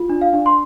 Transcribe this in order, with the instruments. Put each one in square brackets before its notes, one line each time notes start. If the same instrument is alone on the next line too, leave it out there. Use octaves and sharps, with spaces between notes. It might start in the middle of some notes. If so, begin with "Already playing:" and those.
Already playing: [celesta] F4
D4
F5
D4
C6